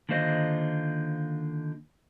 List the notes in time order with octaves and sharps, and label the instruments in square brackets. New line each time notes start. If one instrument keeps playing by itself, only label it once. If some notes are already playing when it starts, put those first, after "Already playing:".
[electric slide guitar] D3 D#3 A#3 F4 C5 D#5